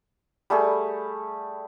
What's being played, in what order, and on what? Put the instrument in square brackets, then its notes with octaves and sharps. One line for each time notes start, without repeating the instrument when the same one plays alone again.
[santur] G3 A3 G#4